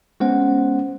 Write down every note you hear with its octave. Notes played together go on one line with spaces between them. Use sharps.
G#3 B3 C#4 C5 F#5